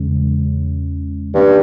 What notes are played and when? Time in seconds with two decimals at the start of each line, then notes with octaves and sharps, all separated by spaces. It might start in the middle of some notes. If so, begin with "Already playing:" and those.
Already playing: E2 C#3 G#3 C#4
1.34 G2 D#3 A#3 C#4